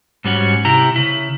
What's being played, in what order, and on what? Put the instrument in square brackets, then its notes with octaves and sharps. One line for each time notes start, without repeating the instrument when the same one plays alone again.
[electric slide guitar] G#2 G3 C#4 F#4
C3 E4 G4 A#5
C#3 E4